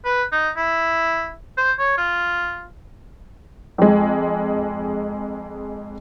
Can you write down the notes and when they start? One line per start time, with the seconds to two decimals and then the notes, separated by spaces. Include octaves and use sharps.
0.05 B4
0.32 D#4
0.57 E4
1.58 C5
1.78 C#5
1.98 F4
3.78 F2 G#3